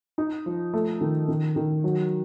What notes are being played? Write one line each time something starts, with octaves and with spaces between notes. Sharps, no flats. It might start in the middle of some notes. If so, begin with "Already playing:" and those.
D#4
F3
A3
D#3
D#3
D#3
F#3